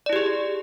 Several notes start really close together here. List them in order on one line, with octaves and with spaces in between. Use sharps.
D5 E4 G4 G#4